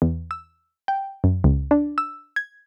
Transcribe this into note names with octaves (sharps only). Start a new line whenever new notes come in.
E2
E6
G5
F#2
C#2
D4
E6
G#6